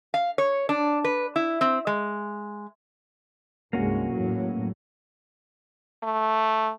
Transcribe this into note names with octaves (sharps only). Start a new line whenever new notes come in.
F5
C#5
D4
B4
E4
C4
G#3
C2 G2 G#3 A#3 C#4 F#4
E2 A2 F#3
A3